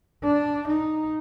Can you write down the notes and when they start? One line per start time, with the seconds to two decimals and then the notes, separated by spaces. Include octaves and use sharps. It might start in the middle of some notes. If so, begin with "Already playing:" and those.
0.24 D4
0.68 D#4